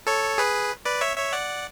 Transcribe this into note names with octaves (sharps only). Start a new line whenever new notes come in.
A4 C#5
G#4 B4
B4 D5
C#5 E5
C#5 E5
D5 F#5